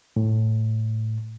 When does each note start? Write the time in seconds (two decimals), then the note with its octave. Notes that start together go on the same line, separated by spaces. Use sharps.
0.16 A2